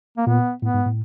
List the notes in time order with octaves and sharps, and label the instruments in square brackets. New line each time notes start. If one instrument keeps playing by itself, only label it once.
[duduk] A#3
[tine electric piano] A#2 [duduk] B3
[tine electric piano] A2 [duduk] B3
[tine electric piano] G#2
A2